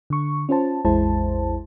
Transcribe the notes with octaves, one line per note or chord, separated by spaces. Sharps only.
D3 C#6
C#4 F4 C5 A5
A1 E2 G#3 E4 C5 A5